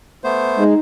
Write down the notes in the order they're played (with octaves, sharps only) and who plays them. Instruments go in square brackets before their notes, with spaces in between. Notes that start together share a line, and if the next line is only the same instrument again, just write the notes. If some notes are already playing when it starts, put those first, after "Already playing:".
[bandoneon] A3 B3 C5
[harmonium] G#3 [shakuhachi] D#4